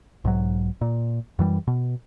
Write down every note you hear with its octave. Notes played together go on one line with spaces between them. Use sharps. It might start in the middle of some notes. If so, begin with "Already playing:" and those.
B1 G#2 F#3
A#2
F#2 E3 G3
B2